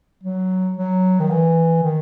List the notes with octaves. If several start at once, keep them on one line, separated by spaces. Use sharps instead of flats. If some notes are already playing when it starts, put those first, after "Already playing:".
F#3
F#3
D#3
E3
D#3